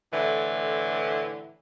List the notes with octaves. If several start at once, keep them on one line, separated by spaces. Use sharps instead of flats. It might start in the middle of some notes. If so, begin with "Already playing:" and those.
A2 D3 E3